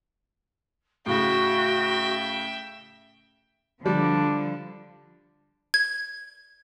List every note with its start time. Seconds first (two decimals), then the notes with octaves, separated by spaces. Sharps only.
1.06 A2 C#3 F#4 E5 G5
3.86 D3 F3 G3 D4
5.74 G#6